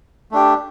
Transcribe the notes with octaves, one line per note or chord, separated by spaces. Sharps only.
A3 D4 G4